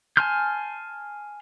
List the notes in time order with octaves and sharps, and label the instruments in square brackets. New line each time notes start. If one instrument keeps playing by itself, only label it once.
[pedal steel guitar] G#5 A5 C6 F6 G6